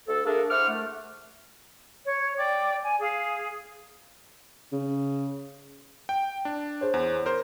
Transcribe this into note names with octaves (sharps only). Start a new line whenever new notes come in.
D2 A4
A3 A#3 D4 G#4 A#4
E4 C5 F#5 D6 F6
A3
C#5
D5 G5 D6
G#5
G#4 F5
C#3
G5
D4
G#4 C5 C#5
E2
A#4 C5